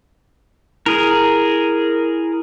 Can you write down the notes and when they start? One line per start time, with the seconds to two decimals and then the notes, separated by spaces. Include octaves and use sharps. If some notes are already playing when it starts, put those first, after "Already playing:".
0.86 E4 G#4 A#4